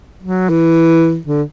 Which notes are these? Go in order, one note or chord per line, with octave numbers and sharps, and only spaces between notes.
F#3
E3
D3